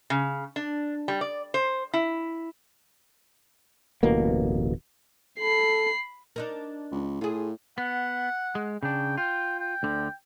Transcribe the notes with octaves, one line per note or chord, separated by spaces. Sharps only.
C#3
D4
G3
D5
C5
E4
D1 A1 B2 A#3
A4 B5 C7
D4 D#4 A#4
C#2
A2 F4 G#4
B3 F#5
G#3
C#3 D4 G5
F4 G5
G5
D2 D3